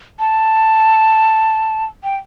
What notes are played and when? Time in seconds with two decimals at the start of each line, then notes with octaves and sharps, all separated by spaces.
0.19 A5
2.04 G5